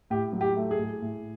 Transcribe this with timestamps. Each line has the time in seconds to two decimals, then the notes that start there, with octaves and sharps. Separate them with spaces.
0.10 A2 G4
0.33 F#3
0.41 G4
0.56 A3
0.71 G#4
0.79 A2
1.02 A2